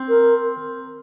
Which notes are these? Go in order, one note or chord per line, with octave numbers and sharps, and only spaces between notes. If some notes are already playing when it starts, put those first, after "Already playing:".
Already playing: C4
A#4